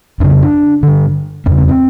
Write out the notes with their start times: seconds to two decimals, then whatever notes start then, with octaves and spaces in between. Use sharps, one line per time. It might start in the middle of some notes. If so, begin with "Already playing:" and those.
0.20 F2 C#3 D4
0.42 D4
0.83 G2 D3
1.46 E2 C#3 C#4
1.58 C4
1.68 C4